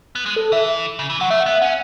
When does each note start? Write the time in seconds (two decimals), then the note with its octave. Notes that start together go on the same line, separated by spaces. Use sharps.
0.15 B3
0.26 G#3
0.36 A4
0.52 E3 E5
0.99 C#3
1.10 E3
1.20 F#3 F#5
1.30 A3 E5
1.40 F#5
1.46 B3 E5
1.62 C#4 F#5